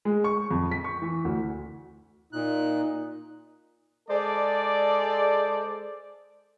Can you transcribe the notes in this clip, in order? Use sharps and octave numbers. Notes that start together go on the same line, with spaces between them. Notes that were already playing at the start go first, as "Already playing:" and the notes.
G#3
C#6
F2
B6
C#6
E3
D2
A#2 D#4 F#6
G#3 A4 C5 D5